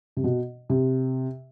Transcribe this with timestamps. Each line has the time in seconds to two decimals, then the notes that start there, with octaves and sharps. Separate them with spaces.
0.17 C3
0.24 B2
0.70 C3